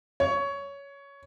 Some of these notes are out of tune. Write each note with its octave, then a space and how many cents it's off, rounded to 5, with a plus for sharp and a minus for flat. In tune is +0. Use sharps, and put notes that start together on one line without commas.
C#5 +15